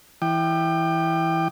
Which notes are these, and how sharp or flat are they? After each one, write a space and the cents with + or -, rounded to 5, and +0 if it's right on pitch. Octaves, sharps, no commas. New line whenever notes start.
E3 +0 G5 +0 D6 +35